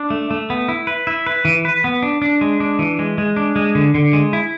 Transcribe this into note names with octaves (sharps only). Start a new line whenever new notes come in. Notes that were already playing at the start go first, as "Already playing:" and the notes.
Already playing: D4
A3
A3
B3
E4
B4
E4
B4
E3
B4
B3
D4
D4
G#3
D4
E3
G#3
G#3
D4
G#3
D3
D3
G#3
E4